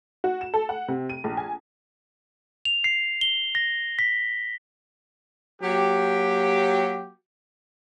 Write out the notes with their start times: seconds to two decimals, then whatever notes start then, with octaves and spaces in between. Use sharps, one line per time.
0.24 F#4
0.41 E7
0.54 A4
0.69 F#5
0.88 C3
1.09 D#7
1.24 A#1
1.37 G#5
2.65 F7
2.84 C7
3.21 G7
3.55 A#6
3.99 B6
5.62 F#3 A#3 F#4 G4